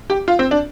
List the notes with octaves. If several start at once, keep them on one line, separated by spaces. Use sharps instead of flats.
G4
F4
C4
D4